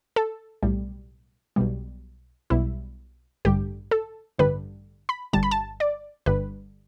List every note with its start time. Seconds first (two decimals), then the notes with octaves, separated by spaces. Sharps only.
0.16 A4
0.63 B1 A2 G3
1.56 B1 B2 G3
2.50 B1 B2 G3 E4
3.45 A1 G2 D3 G3 G4
3.91 A4
4.39 A1 G2 D3 G3 B4
5.09 B5
5.33 G1 G2 D3 G3 A5
5.43 B5
5.51 A5
5.80 D5
6.26 G1 G2 D3 G3 B4